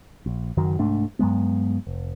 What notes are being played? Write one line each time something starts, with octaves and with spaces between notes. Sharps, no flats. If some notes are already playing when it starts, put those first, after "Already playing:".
A#1
F#1 F#2 D#3 F#3
C2 G#2 A3 D4
G2 F#3 G#3 B3
F1